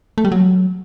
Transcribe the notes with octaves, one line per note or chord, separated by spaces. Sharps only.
A3
G3
F#3